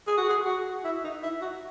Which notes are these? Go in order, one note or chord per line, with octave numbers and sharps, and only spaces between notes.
G#4
F#4
G#4
F#4
E4
D#4
E4
F#4